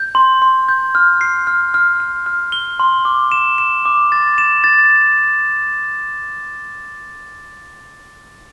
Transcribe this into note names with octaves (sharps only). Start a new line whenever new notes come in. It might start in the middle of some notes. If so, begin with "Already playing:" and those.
Already playing: G6
C6
C6
G6
F6
C7
F6
F6
F6
F6
G7
C6
D6
E7
E7
D6
A6
E7
A6